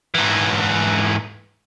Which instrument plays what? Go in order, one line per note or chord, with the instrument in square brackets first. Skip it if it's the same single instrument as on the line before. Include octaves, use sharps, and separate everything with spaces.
[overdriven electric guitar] G#2 E3